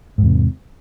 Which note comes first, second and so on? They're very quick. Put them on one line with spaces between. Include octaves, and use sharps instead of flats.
G#2 E2 C3